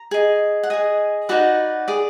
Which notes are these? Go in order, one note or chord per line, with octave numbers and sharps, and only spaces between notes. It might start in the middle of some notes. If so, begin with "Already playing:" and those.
Already playing: A#5
G#4 D#5
F#5
G#4 D#5 G#5
D#4 F#4 B4 D5 F#5
G#4 D5